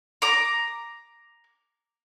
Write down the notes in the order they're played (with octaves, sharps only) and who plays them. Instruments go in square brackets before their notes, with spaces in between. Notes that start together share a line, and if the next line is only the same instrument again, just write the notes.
[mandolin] A#5 D6